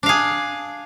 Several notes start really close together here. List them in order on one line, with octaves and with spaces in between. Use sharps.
D4 F5 G#4